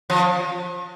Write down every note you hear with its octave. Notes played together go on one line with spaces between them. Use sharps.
F3